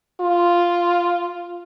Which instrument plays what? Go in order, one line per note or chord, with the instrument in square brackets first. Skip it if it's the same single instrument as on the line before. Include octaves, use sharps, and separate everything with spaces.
[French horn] F4